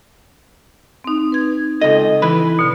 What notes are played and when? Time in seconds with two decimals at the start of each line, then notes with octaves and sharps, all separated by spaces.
1.04 C4 D#4
1.32 B4 G#6
1.81 C#2 A4 D#5
2.22 E3 B4
2.59 B2 D3